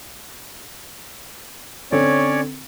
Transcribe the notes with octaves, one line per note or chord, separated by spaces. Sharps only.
D3 C4 C#4 A4 C#5 D5